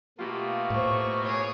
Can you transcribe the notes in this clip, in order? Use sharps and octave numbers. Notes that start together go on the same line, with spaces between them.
B2 A3 A#3 F4 G4
A2 C5 C#6
G#4 C#5